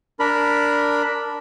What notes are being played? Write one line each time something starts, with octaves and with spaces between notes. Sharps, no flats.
D4 A#4 B5